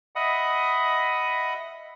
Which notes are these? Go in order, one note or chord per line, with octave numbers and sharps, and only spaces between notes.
D#5 E5 F#5 B5 D#6